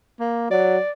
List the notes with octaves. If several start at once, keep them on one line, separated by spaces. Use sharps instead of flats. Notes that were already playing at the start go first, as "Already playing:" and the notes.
A#3
F#3 D5